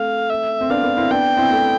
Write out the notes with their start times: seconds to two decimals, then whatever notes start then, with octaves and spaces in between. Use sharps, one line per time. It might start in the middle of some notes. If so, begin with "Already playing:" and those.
Already playing: A3 C4 F5
0.30 E5
0.61 C4
0.70 B3 D4 F5
0.83 B3 D4
0.97 C4 E4
1.11 B3 D4 G5
1.37 C4 E4
1.51 A3 C4